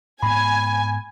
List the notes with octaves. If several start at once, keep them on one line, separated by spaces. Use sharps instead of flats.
G#2 B3 G#5 B5